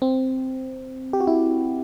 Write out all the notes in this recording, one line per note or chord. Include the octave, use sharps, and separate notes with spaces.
C4
G4
F#4
E4